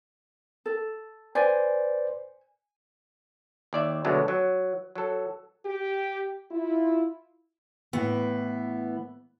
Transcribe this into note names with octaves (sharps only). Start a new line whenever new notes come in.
A4
B4 C5 D5 G#5
D#2 D5 E5
B2 D3 F#3 G#3 A3
F#3
F#3 A4
G4
E4 F4
A2 E3 B3